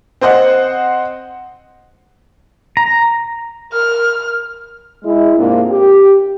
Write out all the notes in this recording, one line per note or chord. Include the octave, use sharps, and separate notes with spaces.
C4 C5 D#5 F#5
A#5
A#4 F6
G#3 E4
G#2 C3 A#3 D4 F4
G4